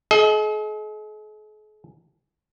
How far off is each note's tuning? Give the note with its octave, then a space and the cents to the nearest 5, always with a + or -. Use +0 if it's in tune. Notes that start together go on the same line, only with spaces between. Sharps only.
G#4 +45 D#5 +25